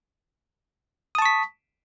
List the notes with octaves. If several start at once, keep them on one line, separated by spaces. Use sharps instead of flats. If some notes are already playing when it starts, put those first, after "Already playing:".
A5 C#6 D#6 B6